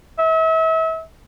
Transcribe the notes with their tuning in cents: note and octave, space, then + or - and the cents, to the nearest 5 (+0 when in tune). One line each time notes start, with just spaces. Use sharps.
E5 -35